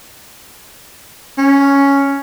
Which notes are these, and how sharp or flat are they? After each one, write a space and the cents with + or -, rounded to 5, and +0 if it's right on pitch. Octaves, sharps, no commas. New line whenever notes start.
C#4 +5